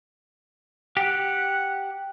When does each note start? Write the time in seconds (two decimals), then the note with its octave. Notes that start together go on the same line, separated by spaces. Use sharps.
0.97 G4 F#5